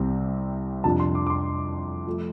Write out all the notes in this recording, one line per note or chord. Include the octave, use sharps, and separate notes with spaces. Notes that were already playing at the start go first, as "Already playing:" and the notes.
Already playing: C2 C3 G3 C4
F2 C3 F3 D4 A5
C6
D6
D6
C6
F3 A3